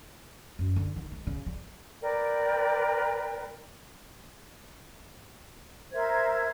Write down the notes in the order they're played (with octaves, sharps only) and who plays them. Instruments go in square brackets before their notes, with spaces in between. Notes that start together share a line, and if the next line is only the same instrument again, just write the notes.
[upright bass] F#2
D3
D#3
G#3
C#3
G3
[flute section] A#4 B4 D5 G5
A#4 C5 E5 G#6